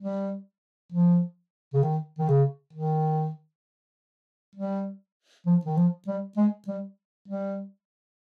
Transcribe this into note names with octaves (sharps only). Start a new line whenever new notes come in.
G3
F3
C#3
D#3
D#3
C#3
D#3
G3
F3
D#3
F3
G3
G#3
G3
G3